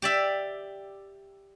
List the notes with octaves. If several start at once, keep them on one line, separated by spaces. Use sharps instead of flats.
G4 D5 E5